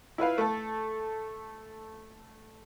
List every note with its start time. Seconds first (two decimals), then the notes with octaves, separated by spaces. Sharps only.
0.18 E4 F4 B4 F5
0.38 A3 A4